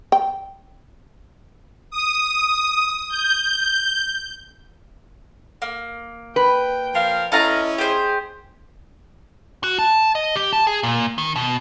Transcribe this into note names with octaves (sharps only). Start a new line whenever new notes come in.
G5
D#6
G6
A#3
B4 G5
F3 A#4 F5
C#4 E4 A4 D#5 F5 A#5
G4 G#4 C5
F#4
A5
D#5
G4
A5
G#4
A#2
D#3
B2